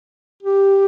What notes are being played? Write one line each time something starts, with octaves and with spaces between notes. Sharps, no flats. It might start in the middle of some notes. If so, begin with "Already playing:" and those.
G4